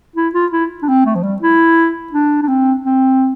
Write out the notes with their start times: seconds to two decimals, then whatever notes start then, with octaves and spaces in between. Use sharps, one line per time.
0.16 E4
0.34 F4
0.52 E4
0.82 D4
0.88 C4
1.06 A3
1.15 F3
1.23 G3
1.42 E4
2.13 D4
2.42 D4
2.48 C4
2.84 C4